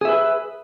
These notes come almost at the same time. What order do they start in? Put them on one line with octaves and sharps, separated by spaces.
G#4 E5 B4